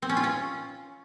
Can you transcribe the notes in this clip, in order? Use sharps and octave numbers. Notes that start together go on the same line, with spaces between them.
C4
C#4
F4
C#4